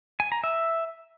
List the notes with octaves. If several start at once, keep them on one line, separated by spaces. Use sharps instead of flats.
G#5
A#5
E5